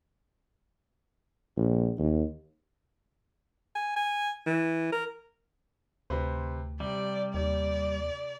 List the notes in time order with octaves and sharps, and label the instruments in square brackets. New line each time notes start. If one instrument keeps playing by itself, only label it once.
[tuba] A#1
D#2
[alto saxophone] G#5
G#5
E3
A#4
[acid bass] D2 [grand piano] C3 B4 C5
[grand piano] C3 [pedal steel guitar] G3 [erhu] D5
[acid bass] D#2 [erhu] D5